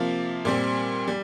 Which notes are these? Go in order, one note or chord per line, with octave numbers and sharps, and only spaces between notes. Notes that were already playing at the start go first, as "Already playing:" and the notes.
Already playing: C3 F3 A#3 F4
A#2 G3 C4
G3